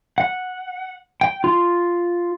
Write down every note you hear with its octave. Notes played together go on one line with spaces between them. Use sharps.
F#5
G5
F4